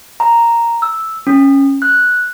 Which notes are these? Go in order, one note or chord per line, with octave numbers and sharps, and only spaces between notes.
A#5
E6
C#4
F#6